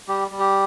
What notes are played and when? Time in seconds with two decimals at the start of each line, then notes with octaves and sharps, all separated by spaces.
0.08 G3 G4
0.31 G3
0.39 G4